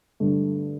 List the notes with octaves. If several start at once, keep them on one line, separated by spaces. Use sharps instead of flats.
G2 D3 A3